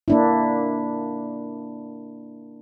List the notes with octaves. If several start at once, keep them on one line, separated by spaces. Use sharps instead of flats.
A#3 D4 E4